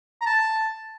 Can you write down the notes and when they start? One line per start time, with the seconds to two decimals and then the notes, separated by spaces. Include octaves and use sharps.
0.21 A#5
0.26 A5